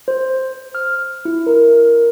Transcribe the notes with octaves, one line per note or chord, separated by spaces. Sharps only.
C5
F6
E4
A#4